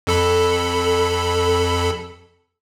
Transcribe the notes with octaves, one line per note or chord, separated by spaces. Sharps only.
F2 A4 B5